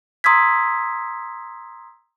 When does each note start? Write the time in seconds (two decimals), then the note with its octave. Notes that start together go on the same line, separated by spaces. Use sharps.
0.24 A#5 C6 D#6 E6 G#6 B6